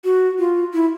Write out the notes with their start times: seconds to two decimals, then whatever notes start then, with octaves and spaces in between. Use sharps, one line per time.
0.04 F#4
0.38 F4
0.73 E4